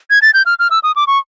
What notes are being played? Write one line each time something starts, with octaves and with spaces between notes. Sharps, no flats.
G#6
A6
G6
F6
F6
E6
D#6
D6
C#6